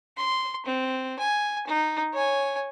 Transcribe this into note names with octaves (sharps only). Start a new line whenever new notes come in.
C6
C4
G#5
D#4
C#5 G#5